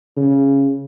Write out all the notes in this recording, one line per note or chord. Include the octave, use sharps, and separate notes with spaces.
C#3